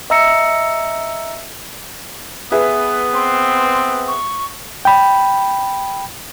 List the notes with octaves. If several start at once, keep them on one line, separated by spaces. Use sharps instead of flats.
D#5 E5 A#5 E6 A#6 C#7
B3 G#4 B4 E5
C4 C6
C#6
G5 B5